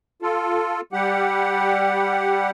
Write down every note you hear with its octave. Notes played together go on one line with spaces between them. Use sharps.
F4 A4
G3 G4 F#5